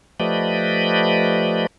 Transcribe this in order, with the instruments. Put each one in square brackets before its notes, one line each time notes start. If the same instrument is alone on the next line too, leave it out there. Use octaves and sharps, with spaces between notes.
[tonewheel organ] F3 A3 G4 B4 D5 D#5